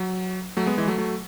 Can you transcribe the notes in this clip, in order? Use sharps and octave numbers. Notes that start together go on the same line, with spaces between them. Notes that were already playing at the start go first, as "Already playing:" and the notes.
Already playing: F#3
F#3 A3
G#3 B3
E3 G#3
F#3 A3
F#3 A3